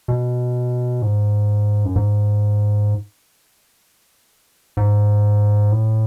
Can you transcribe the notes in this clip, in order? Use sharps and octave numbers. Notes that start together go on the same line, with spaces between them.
B2
G#2
F#2
G#2
G#2
A2